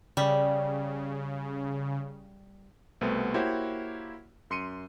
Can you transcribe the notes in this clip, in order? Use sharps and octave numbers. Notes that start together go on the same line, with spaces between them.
C#3 G3
C2 B2 A3 B3 C4
A#3 E4 F#4 G4 C5 C#5
F#2 C6 C#7 D#7